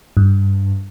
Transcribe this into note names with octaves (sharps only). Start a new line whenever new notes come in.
G2